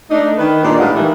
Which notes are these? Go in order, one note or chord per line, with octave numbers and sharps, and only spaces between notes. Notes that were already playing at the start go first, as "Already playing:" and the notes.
A3 D4 D#4
D#3 B4
G2 A#2 D4 D#4 G#4 D5
A2 G3 G#3 B4 F5 F#5
D#3 E3